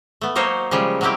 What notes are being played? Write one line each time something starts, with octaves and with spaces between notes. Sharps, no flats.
A3 B3
F#3 A#3 D#4 C5 C#5
C#3 F3 G3 G#3
F#3 G3 A#3 C4 E4 G4